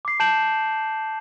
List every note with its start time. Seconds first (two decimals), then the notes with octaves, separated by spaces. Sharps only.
0.05 D6 C7
0.20 A5 G6 D7 E7 F#7